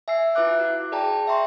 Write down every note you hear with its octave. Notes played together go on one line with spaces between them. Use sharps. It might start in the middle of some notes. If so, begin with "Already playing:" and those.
E5 G#5 E6 C7
E4 F4 B4 E5 D6 F#6
F#4
G#4 D5 G5 A5 A#5
E5 G5 A#5 C6 C#6